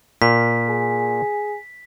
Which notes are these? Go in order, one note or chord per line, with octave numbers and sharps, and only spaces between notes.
A#2 B6
G#4